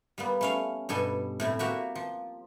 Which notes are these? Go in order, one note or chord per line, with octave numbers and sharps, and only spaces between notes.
G3 A#3 B3
A3 C#4 F5
G2 B2 A4 G#5
A2 C3 E4
A#3 F#4 G4 E5
F3